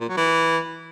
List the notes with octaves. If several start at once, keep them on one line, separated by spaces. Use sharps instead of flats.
A#2
F#3
E3